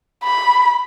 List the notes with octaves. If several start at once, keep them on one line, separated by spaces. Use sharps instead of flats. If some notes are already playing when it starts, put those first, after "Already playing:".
B5